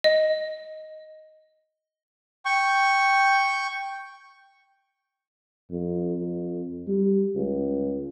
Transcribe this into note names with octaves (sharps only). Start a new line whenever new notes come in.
D#5
G5 C#6
F2
F2
G3
C#2